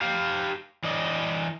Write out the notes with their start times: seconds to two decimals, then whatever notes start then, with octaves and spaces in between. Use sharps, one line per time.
0.01 G4 F5
0.84 E3 D5 D#5